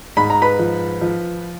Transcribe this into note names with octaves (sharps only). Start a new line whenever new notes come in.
G#2 B5
A#5
B4 B5
F3
F3